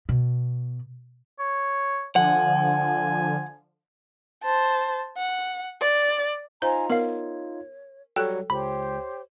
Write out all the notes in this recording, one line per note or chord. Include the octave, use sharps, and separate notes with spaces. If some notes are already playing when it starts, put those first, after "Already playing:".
B2
C#5
D3 F3 F#5 G#5
C5 A5
F#5
D5
D#4 F4 C5 G#5 A#5
B3 A#4 C#5 F5
F#3 G3 A4 C#5 G5 F#6
C#2 G4 C5 C#5 B5